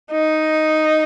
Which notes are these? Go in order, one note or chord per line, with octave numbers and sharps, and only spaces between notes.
D#4